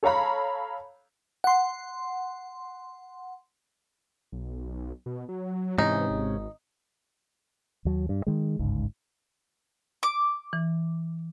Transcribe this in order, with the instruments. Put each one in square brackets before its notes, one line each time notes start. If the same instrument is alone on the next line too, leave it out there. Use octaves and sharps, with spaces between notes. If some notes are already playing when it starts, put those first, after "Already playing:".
[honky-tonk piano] A4 C#5 F5 A#5 B5
[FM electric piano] F#5 C6
[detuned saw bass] B1
B2
F#3
[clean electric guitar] G#2 C3 C#4 [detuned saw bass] E3 [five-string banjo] D#4
[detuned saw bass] G#1
[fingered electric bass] D#2 F#3
G2
D#3 G#3
G1 C#2 G#2
[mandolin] D6
[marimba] E3